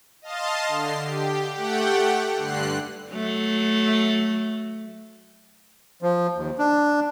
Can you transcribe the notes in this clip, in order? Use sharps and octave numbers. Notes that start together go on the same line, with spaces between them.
D#5 F5 A5 C6
D3 C7
G4
A3 G4 F#5 G5
G2 D3 F#6 C7
F#3 A3
F3
D#2
D4